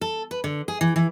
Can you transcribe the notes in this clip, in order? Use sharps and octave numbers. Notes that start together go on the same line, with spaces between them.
A4
B4
D3
G#4
E3
E3